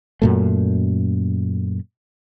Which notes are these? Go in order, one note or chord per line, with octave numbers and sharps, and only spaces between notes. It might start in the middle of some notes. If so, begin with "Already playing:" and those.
F#2 A#2 A3